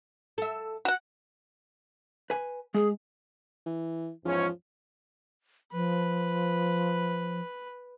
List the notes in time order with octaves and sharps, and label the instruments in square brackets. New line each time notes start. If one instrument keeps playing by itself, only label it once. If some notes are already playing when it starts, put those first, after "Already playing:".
[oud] A4 E5
[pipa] F#4 F#5
[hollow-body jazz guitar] B4 G#5
[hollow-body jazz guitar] G#3 [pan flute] G#4
[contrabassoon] E3
[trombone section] E2 G#2 C#4 [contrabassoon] F3
[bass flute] F3 [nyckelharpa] B4